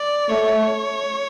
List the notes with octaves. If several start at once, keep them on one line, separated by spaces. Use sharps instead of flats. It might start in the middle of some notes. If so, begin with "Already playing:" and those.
Already playing: D5
A3 C#5